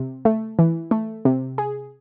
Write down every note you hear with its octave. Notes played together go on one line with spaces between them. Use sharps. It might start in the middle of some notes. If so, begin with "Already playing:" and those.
Already playing: C3
A3
E3
A3
C3
G#4